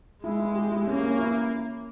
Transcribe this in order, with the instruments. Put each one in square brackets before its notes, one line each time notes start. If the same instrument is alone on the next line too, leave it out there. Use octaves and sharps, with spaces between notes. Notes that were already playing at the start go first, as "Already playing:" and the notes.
[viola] G#3 [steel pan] E4
[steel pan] E4
G4
E4
[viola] A#3 [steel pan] C#4
[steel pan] C#4
E4